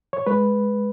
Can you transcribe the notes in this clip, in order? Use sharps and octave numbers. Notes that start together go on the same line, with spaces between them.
C#5
G#3 B4